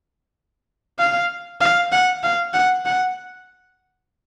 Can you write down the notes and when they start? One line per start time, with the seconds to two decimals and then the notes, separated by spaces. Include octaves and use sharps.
0.99 F5
1.61 F5
1.92 F#5
2.23 F5
2.54 F#5
2.86 F#5